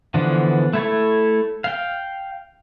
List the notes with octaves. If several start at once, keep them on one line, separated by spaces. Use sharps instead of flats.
D3 E3 F3 B3 D4
A3 E4 A4 C#5
F5 G5